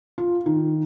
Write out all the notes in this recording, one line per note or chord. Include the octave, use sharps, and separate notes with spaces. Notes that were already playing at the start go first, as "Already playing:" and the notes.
F4
D#3